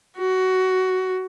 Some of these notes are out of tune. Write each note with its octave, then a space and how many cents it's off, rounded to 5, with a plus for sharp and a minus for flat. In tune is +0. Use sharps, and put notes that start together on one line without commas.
F#4 +15